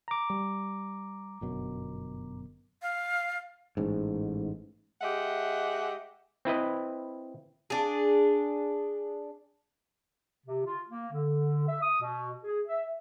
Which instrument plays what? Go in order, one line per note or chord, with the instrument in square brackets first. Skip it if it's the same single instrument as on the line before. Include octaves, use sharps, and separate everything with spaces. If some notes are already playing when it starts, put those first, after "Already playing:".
[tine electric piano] A#5 D6
[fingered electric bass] G3
G1 F#2 B2
[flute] F5
[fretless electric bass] A1 G#2
[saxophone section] G#3 G4 D#5 E5 F#5
[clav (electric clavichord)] C4 E4 B4 D#5
[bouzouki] D4 G#4
[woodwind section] C3
F4
A#3
D3
E5
D#6
B2
G#4
E5